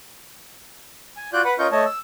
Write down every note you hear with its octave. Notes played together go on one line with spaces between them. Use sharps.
G#5
F4 F#4 D5 F#6 G6
B4 F#5 B5
C#4 F4 A#4 D#5 C#6 G6
A3 C#5 D#5 A5
E6